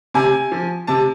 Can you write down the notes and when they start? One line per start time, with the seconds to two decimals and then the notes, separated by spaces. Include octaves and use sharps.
0.14 C3 G#5
0.52 F3
0.87 C3 A5